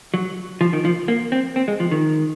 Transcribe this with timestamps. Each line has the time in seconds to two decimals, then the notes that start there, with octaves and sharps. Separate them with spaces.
0.14 F#3
0.61 F3
0.73 D#3
0.85 F3
1.08 A#3
1.32 C4
1.56 C4
1.68 G#3
1.80 F3
1.91 D#3